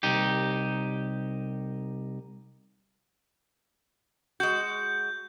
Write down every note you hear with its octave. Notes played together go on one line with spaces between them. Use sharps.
C2 D#4 G4
G#3 F#4 G6